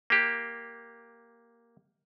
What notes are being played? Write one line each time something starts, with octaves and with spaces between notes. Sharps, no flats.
A#3 G4